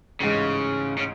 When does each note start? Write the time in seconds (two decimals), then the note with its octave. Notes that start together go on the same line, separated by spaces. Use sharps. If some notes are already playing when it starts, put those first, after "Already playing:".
0.20 A1 G#2 C#3 G#3
0.98 C#3